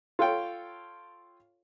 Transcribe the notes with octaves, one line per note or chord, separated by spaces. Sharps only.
F4 A4 C#5 F5 G5